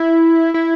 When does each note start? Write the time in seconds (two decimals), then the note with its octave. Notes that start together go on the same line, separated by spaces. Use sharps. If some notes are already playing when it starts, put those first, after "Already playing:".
Already playing: E4
0.54 E4